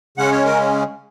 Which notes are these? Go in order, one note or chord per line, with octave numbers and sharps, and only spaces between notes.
C#3 G#3 C#4 F#5
C#5
A#4